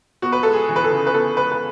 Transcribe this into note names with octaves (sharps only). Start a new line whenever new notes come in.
B3 F#4
B4
G#3 A4
G#4
E3
B4
A4
C#3
B4
B3 A4
G#3 B4
B4